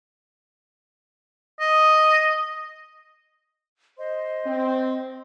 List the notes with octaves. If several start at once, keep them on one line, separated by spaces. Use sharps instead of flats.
D#5
C5 D#5 C6
C4